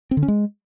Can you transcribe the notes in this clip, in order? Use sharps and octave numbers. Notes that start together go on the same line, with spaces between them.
C4
D3
C#4
G#3